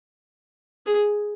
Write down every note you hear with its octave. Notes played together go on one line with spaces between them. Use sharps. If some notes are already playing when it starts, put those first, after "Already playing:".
G#4